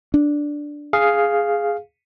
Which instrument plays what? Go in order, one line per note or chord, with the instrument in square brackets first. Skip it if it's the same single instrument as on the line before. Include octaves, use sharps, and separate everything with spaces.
[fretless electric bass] D4
[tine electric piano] G#4 F5